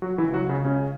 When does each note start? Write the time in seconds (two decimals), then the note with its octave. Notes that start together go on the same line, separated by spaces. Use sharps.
0.02 F#3 F#4
0.18 E3 E4
0.23 C#2
0.33 F#3 F#4
0.44 C#2
0.49 C#3 C#4
0.65 C#2 C#3 C#4